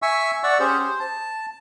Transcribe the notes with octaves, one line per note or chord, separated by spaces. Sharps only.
E5 G#5 C#6 E6
D5 F#5 C#6 E6
C#4 G4 G#4 C5
C5
A5